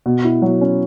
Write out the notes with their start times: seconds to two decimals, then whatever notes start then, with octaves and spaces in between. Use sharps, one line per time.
0.06 B2
0.24 E4
0.42 F#3
0.61 C#4